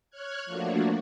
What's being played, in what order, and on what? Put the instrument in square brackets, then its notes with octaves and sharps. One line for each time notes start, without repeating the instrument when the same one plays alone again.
[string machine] C#5 F6 F#6 G#6
F3 A3 A#3 D4 F#4